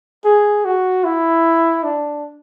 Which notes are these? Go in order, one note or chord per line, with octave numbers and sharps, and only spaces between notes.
G#4
F#4
E4
D4